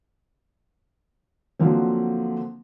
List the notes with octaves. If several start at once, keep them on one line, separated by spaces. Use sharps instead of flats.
D3 F3 F#3 A#3 C4